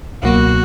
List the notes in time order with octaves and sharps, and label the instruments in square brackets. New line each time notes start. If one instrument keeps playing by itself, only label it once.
[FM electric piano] C#2 B2 F#3 A#3 [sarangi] F#4